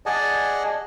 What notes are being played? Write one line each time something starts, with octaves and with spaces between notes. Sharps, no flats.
G#4 D5 D#5 F#5 G#5 A5